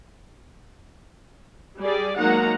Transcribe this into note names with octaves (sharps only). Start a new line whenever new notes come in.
G3 G#4 D5
F#3 G#3 A#3 D#4 F#5 A#5